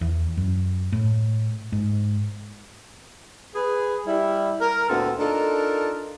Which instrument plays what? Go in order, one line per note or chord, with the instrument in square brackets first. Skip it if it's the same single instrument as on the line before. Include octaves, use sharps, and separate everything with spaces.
[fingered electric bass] E2
F#2
A2
G#2
[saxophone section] G#4 B4
G3 E4
A#4
D2 A#2 B3 C4 E4 A4
D4 D#4 F4 A4 A#4